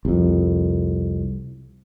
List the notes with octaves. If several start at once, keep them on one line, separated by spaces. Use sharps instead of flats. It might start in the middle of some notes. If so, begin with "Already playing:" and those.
C2 F2